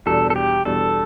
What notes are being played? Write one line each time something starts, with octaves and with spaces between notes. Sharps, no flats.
E2 B2 G3 D4 A4
A4
G4
E2 B2 G3 D4 A4